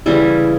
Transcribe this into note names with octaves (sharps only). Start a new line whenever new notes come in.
C#3 E3 G3 E4